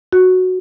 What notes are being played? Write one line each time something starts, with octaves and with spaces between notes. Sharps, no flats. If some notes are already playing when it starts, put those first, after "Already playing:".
F#4